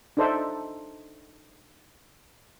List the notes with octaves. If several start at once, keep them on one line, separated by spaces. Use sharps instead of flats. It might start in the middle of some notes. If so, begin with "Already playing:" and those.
D4 D#4 A4 C5 D5 E5